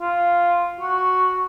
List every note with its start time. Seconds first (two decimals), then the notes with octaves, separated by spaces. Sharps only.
0.01 F4
0.80 F#4